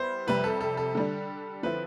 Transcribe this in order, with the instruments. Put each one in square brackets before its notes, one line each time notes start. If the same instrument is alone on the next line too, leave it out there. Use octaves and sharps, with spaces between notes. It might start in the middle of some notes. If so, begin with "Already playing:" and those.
Already playing: [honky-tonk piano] G3 B3 E4 [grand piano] C5
[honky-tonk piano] F2 C3 G3 [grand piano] B4
[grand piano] A4
A4
A4
[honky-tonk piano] D3 G3 D4
[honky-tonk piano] D3 F3 C4 E4 [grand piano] B4